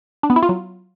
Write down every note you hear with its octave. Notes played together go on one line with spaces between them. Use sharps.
D4
B3
E4
F4
F#3